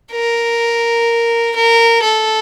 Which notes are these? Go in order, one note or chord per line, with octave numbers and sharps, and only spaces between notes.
A#4
A#4
A4